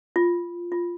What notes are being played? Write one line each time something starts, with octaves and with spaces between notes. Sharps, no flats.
F4
F4